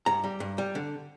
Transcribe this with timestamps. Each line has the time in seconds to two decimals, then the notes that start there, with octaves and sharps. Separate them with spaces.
0.06 G2 A#5
0.24 G3
0.40 G2
0.58 G3
0.75 D3